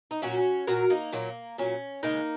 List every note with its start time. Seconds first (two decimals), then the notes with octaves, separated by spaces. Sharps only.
0.11 D#4
0.22 A#2 F#3 C#4 F#4
0.67 A#2 F#3 F#4 A#4
0.90 A#3 D#4
1.12 A#2 F#3 A#3
1.58 A#2 F#3 C#4
2.03 C#3 G#3 A#3 D#4